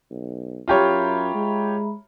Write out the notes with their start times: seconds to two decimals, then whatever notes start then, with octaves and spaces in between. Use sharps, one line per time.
0.11 B1
0.68 F#2 F4 G4 C#5 E5 A#5 B5
1.35 G#3